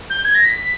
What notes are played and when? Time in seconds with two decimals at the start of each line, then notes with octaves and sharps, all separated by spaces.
0.10 G6
0.25 G#6
0.35 A#6
0.45 B6